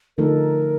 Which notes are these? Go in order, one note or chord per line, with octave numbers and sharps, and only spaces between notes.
D3 F3 A3 D#4 A4 A#4